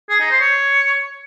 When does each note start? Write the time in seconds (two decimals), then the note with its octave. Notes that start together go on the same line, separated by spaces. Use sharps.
0.09 G#4
0.20 D#4
0.30 C5
0.41 C#5